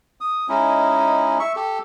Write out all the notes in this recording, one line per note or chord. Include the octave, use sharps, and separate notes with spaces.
D#6
G#3 C#4 D#4 E4
E5 C#6
G4 A4